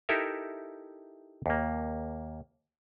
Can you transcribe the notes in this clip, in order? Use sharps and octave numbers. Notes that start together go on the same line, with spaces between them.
D#4 E4 G4 A4 A#4 E5
D#2 A#3